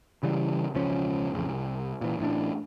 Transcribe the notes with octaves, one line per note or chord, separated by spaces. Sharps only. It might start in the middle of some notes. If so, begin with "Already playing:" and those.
C#3 E3 G3
E1 C#2 F3 C#4
A1 F2 C#3
C2
A#2 E3
A1 A2 D4